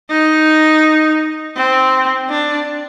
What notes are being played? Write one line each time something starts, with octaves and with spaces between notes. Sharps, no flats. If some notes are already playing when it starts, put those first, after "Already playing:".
D#4
C4
D4